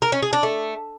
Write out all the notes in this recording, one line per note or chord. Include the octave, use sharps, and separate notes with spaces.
A#4
C#4
G#4
D4
A3